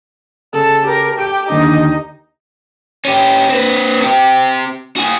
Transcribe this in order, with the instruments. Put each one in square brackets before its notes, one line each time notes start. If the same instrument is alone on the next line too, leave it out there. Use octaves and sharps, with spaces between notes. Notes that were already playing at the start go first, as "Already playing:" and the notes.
[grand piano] C#3 [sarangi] A4
[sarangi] G4 [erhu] A#4
[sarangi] G4 [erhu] G5 [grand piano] D7
[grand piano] D#2 D3 [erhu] D#4
[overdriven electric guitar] C#4 G4
C4 B4
C3 G4
F#4 G#4